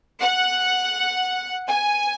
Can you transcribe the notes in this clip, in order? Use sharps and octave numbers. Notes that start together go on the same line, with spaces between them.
F#5
G#5